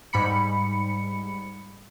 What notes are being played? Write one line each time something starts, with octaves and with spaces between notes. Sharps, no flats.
G#2 G3 B5 C#7